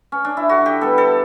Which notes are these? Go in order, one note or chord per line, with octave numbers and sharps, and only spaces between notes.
C#4
D4
E4
D3 F#4
G4
G3 B3 A4
A4